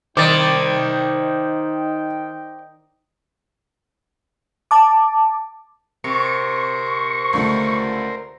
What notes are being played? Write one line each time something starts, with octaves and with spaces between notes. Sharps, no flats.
D#3 D#4 C5 D5 G5 D6 A6
A5 D6
C3 A#4 C5 C#6
C#2 D3 A3